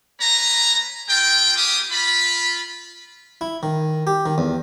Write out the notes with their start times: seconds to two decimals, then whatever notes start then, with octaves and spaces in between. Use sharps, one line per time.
0.20 A#3 B4 C#5 A#5
1.09 G#3 F4 G#4 G5
1.56 B3 G4 G#4 F5 D6 D#6
1.91 F4 B5
3.41 E4
3.63 D#3
4.07 G4
4.26 D#3
4.38 E2